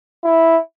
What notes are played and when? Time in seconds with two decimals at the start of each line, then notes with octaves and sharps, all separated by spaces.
0.24 E4